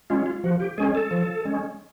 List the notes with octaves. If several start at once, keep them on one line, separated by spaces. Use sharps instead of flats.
G#3 C#4 F4
F4
F3 F#4
G4
G#3 C#4 G#4
A4
F3
G#3 C#4